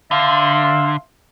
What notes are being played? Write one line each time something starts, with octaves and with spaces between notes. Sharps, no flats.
D3 E5 F5 C6